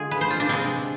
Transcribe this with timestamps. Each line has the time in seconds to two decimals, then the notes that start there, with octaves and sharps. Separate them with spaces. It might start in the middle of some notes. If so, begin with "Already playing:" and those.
Already playing: D3 G#3 F4 G#4
0.11 B4
0.21 C5
0.30 F4
0.40 D4
0.49 C3 G#3 C4